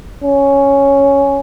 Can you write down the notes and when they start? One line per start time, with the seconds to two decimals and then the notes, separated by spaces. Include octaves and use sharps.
0.24 C#4